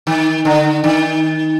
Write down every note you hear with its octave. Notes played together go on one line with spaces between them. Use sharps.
D#3
D3
D#3